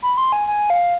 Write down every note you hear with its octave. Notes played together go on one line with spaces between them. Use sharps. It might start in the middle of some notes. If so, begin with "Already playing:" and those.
B5
C6
G#5
G#5
F5